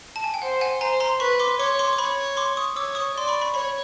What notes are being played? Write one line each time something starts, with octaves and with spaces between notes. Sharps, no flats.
A5
G#5
G5
C5 F#5
F#5 G#5
C5 G#5 A#5
A#5 C6
B4 B5 C#6
C6 D6
C#5 C6 D6
C6 D6
D6
C#5 B5 C#6
C6 D6
C#6 D#6
C#5 D6 E6
C#6 D#6
D5 C6
B5 C#6
B5 C#6
C#5 B5 C#6